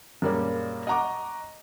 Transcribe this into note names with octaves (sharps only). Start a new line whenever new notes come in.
F#2 A#2 G3 G#3 A#3 C#4
D#5 F#5 A#5 C#6 D6